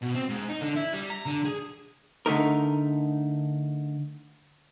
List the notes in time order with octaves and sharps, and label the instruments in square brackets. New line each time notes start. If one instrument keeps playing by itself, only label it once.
[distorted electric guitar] B2
C4
G#2
D#4
D3
E4
G3
A#5
D3
G#4
[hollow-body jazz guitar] D3 A3 D#4 A#4